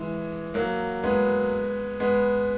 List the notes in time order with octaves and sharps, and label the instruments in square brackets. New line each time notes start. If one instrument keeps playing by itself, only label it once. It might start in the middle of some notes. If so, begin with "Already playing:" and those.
Already playing: [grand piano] E3 G#3
F#3 A#3
G#3 B3
G#3 B3